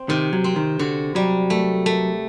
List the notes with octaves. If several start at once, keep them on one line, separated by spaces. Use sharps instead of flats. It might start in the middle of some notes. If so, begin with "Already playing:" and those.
Already playing: C4
C3 D#3
F#3
C4
D#3
D3 F#4
F#3 G3
A3
A3